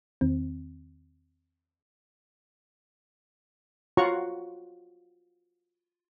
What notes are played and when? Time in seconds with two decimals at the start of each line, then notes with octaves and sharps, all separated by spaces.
0.21 E2 D#3 C4
3.97 F4 F#4 C#5 F#5 A#5 C#6